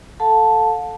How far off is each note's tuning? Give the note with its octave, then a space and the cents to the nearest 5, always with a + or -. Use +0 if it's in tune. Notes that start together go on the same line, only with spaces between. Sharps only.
A4 +0 F5 +45 A5 +0